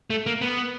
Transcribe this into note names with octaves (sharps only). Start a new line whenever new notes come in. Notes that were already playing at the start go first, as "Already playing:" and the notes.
A3
A#3
B3